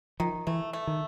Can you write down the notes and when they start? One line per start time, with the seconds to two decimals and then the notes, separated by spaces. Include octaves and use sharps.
0.20 D#3 F3
0.47 E3 A3
0.73 A3
0.87 D#3